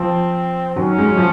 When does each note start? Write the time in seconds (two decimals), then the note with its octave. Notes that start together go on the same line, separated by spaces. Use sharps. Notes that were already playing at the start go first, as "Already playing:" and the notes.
Already playing: F3 C4
0.76 D#3 F#3 C#4
0.98 G#3
1.08 F#3
1.17 F3